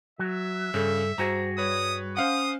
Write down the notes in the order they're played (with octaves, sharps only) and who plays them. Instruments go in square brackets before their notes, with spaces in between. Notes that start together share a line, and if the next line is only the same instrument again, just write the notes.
[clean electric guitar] F#3 [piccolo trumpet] E5
[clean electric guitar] G2 [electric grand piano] C#3 [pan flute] A4
[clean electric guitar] G2 F#4 G#4 [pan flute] C5 [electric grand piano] A#5
[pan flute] G3 [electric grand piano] B4 C#5 [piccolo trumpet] D#6
[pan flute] C#4 [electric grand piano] C5 F5 F#5 [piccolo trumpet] D#6